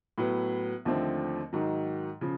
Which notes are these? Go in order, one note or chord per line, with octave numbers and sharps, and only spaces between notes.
A2 F#3 B3
D#2 D3 F3 A3 C4
G#2 D#3 F#3
C#3 F3